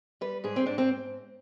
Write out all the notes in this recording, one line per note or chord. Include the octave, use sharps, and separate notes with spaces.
G3 B4
G#2 G#4
C4
G#2 D4
C4